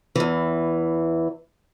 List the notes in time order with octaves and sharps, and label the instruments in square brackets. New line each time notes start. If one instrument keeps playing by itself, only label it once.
[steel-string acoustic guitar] E2 E3